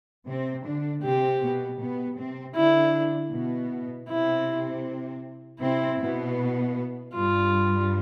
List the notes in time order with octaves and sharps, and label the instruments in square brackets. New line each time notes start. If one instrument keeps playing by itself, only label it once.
[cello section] C3 C4
D3 D4
[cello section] C3 C4 [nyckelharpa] G4
[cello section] B2 B3
B2 B3
C3 C4
[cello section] D3 D4 [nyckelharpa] E4
[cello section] B2 B3
[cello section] C3 C4 [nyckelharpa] E4
[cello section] C3 C4 [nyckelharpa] E4
[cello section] B2 B3
[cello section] G2 G3 [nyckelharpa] F4